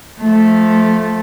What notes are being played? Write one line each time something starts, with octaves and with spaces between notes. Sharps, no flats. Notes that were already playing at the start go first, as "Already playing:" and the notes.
F3 A3